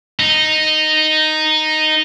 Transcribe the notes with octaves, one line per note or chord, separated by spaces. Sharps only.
D#4